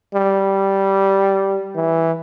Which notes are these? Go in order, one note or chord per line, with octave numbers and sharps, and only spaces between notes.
G3
E3